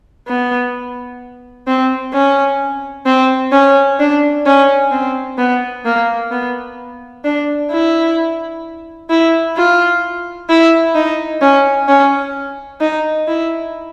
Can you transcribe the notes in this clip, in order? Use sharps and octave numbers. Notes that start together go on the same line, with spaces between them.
B3
C4
C#4
C4
C#4
D4
C#4
C4
B3
A#3
B3
D4
E4
E4
F4
E4
D#4
C#4
C#4
D#4
E4